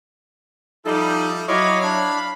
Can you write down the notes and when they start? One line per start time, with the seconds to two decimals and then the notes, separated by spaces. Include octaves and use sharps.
0.85 F3 G3 D#4 E4 A4
1.48 F#3 E4 C#5 D#5 F5 B5 C#6 D6
1.83 D4